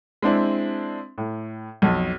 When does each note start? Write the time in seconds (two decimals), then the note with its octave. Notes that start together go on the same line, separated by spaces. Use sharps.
0.22 G#3 C4 D4 E4
1.18 A2
1.82 B1 F2